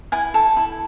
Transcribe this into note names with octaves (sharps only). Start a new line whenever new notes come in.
E4 G#5
A4
E4